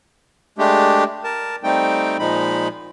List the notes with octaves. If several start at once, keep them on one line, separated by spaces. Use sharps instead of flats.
G#3 A3 D4 G4
A#4 A5
G3 A3 C4 D#4 G5
A#2 F3 G#3 D#4 B5